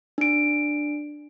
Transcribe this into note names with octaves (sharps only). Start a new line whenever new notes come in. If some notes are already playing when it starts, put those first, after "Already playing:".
D4 D7